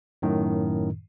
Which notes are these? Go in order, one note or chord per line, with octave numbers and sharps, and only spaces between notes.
F#2 A2 D#3